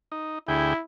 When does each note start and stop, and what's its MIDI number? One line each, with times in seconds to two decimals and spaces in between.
0.12 0.39 63
0.48 0.73 38
0.48 0.83 64
0.48 0.73 68
0.48 0.73 79